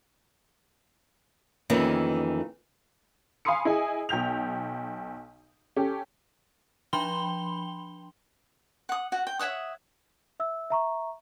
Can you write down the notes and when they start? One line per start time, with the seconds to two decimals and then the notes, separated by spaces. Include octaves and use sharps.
1.70 F2 D#3 E3 A#3 B3 C#4
3.45 F5 G#5 B5 C6 D#6 C#7
3.65 E4 G#4 D#5 G#5
4.09 B1 G5 G6 F7
5.76 C#4 G4 A4
6.93 F3 D4 G5 B5 C6 G7
8.89 F#5 D#6
9.12 F#4 F#5
9.27 G5
9.39 C#5 E5 F#5 D#6
10.40 E5 E6
10.70 E5 A#5 C#6